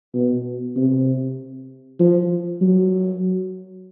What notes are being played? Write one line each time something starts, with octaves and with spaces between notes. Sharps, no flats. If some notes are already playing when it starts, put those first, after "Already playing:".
B2
C3
F3
F#3